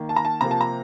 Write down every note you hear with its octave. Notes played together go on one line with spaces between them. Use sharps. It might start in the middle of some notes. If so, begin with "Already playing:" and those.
Already playing: D#3 A#3
A5
A#5
A5
C3 F3 A#3 A#5
A5
A#5